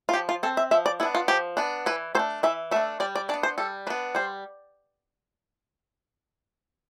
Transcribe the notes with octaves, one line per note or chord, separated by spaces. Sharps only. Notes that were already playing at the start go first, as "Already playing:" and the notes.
F4
F3 G4
F4
C4 A4
E5
F3 E5
D5
B3 D4 E4
F4
F3 G4
B3 D4
E3 B4
A3 D4 C5
E3 E5
A3 D4 E5
G3 D5
D5
B3 D4 D5
C5
G3 A4
B3 D4 B4
G3 C5